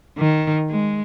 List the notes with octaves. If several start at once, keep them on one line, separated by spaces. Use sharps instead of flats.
D#3
G#3